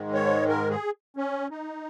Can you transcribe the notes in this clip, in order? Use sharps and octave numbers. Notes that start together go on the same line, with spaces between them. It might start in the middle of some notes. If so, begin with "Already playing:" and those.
Already playing: G#2 D#3 G#3
C#5
A#4
G#4
C#4
D#4